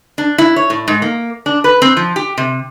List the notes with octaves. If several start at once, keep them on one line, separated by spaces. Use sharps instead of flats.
D4
E4
C#5
A2
G#2
A#3
D4
B4
C4
F3
G4
C3